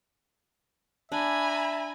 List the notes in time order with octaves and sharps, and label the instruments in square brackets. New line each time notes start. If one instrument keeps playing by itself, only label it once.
[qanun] D4 [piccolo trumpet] E5 [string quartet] G#5 A#5 B5